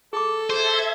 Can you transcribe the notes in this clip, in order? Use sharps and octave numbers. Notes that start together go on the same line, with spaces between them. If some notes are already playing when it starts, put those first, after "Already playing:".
G#4 A4 D6
G#4 C5 E5 G#6